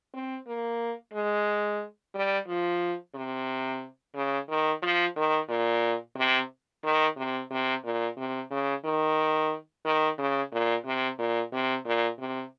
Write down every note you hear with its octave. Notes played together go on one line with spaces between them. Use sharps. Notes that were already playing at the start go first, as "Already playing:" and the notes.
C4
A#3
G#3
G3
F3
C3
C#3
D#3
F3
D#3
A#2
C3
D#3
C3
C3
A#2
C3
C#3
D#3
D#3
C#3
A#2
C3
A#2
C3
A#2
C3